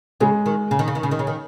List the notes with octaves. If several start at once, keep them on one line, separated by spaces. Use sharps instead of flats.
C#3 G#3
D#3
C#3
D#3
C#3
D#3
C#3
D#3
C#3
D#3